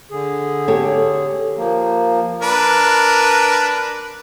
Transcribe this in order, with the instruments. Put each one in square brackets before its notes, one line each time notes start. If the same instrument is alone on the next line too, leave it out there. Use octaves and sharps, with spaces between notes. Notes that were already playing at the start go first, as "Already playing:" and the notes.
[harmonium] D3 G#4
[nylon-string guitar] G4 A4 C#5
[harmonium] F3 A#3
[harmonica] D4 A#4 B4